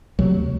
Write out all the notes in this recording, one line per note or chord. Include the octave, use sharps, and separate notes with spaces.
D2 C3 F#3